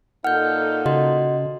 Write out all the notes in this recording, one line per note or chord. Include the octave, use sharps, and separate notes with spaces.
A#2 D#4 A4 F#5 F6 G6
C#3 F#4 D#5 C6